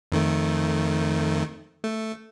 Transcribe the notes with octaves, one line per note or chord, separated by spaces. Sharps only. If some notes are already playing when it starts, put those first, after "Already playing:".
F2 D#3 A3
A3